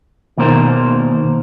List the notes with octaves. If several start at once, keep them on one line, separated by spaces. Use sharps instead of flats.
D#2 B2 D#3 A#3 A#4 C5